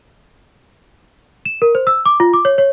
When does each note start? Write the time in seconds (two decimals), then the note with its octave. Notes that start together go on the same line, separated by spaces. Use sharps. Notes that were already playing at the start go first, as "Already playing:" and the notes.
1.45 E7
1.62 A#4
1.75 C5
1.87 E6
2.06 D6
2.20 F4
2.34 D6
2.45 C#5
2.58 C#5